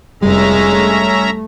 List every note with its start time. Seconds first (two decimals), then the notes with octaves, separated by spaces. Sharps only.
0.22 F1 G3 G#3 C#4 E5 A#5
0.70 A3